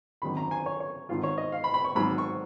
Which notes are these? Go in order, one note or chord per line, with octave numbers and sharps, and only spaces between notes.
G#1 F#2 D#3 B5
A#5
G#5
C#5
C#5
G#1 G#2 D#3 F4
C#5
D#5
F5
B5
B5
C#6
G#1 G#2 F#3 B5
C#6